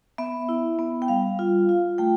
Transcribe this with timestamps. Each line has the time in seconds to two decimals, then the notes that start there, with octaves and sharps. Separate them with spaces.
0.18 B3 E5
0.49 E4
0.79 B3
1.02 G5
1.08 G3 F5
1.39 F4
1.69 F4
1.98 A3 G5